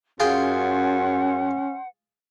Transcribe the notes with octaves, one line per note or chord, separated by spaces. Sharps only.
F#2 C#4 F4 G#4 C5 F#5 G5